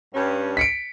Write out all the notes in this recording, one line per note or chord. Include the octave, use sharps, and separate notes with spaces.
G2 C#4
B6 C#7 D7